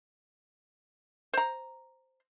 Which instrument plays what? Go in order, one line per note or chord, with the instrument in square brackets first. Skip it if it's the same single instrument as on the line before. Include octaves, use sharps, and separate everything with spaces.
[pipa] C5 A#5